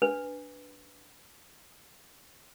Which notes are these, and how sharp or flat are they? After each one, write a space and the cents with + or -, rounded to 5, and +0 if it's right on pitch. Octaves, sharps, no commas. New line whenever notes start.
D4 -10 B4 +0